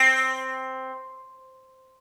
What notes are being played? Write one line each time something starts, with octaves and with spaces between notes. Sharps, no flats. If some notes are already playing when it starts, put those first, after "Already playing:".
Already playing: C4